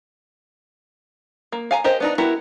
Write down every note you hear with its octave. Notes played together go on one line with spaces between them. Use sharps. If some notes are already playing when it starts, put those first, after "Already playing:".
A#3
F5 G#5 A#5
G4 A#4 C5 D#5
B3 D4 D#4
B3 E4 F#4 G4 A#4